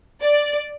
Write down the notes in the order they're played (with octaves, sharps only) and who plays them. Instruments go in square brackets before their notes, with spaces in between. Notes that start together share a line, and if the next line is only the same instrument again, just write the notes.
[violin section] D5